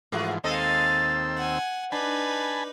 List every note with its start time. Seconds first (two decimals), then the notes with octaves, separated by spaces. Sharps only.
0.12 G#2 E3 F3 A3 F#4 G#4
0.44 D#2 G#3 C4 A4 D#5 F5 E6
1.37 F#5 G#5
1.92 D4 D#4 B4 G#5 A5 B5